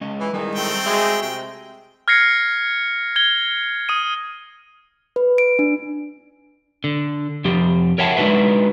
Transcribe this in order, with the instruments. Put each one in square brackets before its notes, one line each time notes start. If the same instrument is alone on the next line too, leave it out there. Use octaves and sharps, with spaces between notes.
[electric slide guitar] G#3 C#4 D#5
[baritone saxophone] E3
[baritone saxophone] D#3 [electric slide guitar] G3 G#3 E4
[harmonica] A3 C4 G5
[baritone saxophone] G#3 [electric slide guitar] F#4 E5
[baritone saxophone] C3 [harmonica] G5
[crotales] F6 G#6 A#6 C7 C#7
G#6 G7
D#6 D#7
[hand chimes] B4
D7
D4
[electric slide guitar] D3
F2 F3 G4
A#4 C#5 E5 F#5 G5 A5
G#3 D4 D#4 F#4 B4 E5